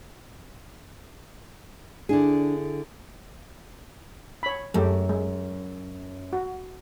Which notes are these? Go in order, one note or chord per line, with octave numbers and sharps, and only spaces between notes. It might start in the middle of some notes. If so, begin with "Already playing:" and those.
D3 D4 E4 G#4
C#5 B5
F#2 G#3 A3 G4
G#3
F#4